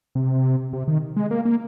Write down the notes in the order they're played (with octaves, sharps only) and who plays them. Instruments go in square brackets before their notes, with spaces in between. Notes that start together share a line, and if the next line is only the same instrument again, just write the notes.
[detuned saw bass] C3
C3
D#3
G#3
A#3
A#3